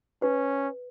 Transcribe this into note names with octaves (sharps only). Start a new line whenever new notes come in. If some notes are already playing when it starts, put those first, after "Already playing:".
C#4 B4